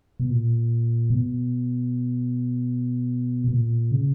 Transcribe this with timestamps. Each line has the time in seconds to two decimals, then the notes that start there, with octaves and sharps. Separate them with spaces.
0.20 B2
0.30 A#2
1.10 B2
3.48 B2
3.52 A#2
3.92 C#3